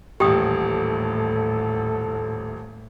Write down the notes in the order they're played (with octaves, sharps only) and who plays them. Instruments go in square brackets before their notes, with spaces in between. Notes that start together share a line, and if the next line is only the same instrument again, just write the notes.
[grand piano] D#1 A1 [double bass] A2 [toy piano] G4 G5 D#6 [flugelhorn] A4